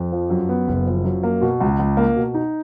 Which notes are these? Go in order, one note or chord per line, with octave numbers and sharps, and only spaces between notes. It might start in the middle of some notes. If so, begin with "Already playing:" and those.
Already playing: F2
F3
F#2
B3
F#1
F3
F#2
A#3
B2
C#2
C#2
A#3
B2
D#4